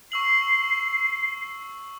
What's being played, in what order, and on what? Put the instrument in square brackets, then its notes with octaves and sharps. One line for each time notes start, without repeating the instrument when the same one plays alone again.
[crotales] C#6 E6 F#7 [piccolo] C7